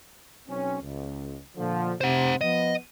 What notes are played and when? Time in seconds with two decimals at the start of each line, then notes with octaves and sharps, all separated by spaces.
0.48 B1 C4 C#4
0.82 C#2
1.57 A#2 D3 F3
2.01 C3 C5 F#5
2.41 F3 B3 D#5